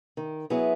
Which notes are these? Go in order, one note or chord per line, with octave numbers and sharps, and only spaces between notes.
D#3
F#3 B3 E4 G#4